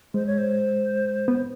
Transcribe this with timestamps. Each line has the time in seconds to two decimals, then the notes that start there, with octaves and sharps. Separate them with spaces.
0.14 G#3 C5
0.27 C#5
0.38 C5
1.28 B3